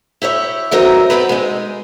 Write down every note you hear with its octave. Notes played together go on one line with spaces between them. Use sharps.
E4 G4 C#5 E5
E3 F#3 C4 D#4 A#4
B3 C4 G4 B4
G#3 D#4